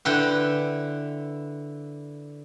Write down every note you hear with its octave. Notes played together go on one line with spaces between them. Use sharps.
D3 E4 B4 G5